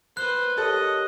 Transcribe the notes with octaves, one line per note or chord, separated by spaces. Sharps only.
B4 C5 F#6
G4 A4 A#4 C#5 D#5